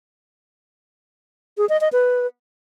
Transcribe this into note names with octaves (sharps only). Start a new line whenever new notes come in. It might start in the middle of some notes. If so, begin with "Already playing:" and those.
G#4
D#5
D#5
B4